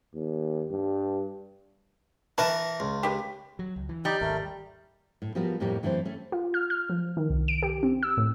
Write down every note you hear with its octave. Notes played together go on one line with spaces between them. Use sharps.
D#2
G2
E3 A#4 B4 A5 C#6
C#2
G4 B4
F#3
C#2
E3
G3 D#4 D5
G#1 D#2 A3 A#4
A2
F3 G3 B3 F#4 A#4 B4
F2 A2 A#3 G4 C#5
F#2 E3 A3 C4 A4 C5
A3 C#4
F4
F6
F6
F3
D#3
C2
D7
G4
C4
E6
A2